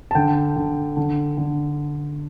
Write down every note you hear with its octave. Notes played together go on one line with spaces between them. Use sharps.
A5
D3 G5
D3
D3
D3